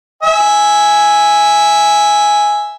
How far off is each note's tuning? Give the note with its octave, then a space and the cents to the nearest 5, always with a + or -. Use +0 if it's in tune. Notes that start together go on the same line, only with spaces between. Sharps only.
E5 +0 G#5 +0